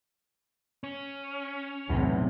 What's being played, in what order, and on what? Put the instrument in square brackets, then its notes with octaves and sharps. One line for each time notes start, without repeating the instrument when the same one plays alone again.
[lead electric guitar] C#4
[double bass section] B1 [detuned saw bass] E2 [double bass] A2 C3